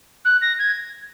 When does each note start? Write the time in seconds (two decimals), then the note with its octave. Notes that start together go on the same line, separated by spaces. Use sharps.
0.25 F#6
0.41 A#6
0.59 G#6